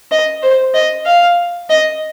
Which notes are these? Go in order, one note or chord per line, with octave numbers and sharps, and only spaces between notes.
D#5
C5
D#5
F5
D#5